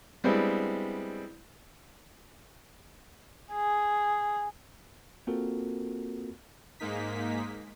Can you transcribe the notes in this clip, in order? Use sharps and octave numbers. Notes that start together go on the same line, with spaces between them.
G3 G#3 B3 C4 D4 E4
G#4
A#3 C4 F4 F#4 A4 A#4
G#2 G#3 A#3 D#4 B6